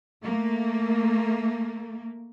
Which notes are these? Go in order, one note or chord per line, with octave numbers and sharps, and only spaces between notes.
A3 A#3